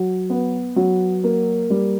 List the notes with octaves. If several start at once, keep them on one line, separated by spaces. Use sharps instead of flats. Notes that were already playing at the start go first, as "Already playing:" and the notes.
Already playing: F#3
B3
F#3
A#3
G3